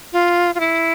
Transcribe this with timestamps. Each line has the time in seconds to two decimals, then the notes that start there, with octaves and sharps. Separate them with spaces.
0.13 F4
0.55 F4
0.60 E4